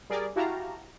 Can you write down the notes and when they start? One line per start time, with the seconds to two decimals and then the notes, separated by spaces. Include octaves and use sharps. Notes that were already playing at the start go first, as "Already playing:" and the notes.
0.10 G3 G#4 A#4 D5
0.36 E4 F#4 G4 F5 A5 A#5